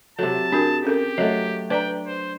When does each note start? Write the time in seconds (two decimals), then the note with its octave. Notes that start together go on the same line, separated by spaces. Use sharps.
0.19 C3 F#3 A4 A5
0.52 D4 F#4 G#4 A#4
0.85 C#4 G4 A4 A#4
1.18 F#3 A3 D#5
1.70 D4 B4 D5 G5 A#5
2.07 C5